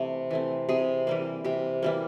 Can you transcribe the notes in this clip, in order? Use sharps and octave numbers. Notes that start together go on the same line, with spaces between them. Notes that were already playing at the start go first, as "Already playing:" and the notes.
Already playing: C3 E3 A3
E3 A3 C4
C3 G#4
E3 G3 A#3
C3 G4
E3 G3 A#3